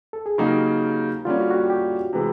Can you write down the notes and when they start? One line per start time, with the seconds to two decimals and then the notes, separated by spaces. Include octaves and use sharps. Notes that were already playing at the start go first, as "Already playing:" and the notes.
0.13 A4
0.26 G#4
0.38 C#3 F#3 A#3 D#4 G4
1.25 D3 G3 A#3 C#4 F4
1.40 F#4
1.50 F#4
1.55 G4
1.70 G4
2.13 C3 E3 G#3 B3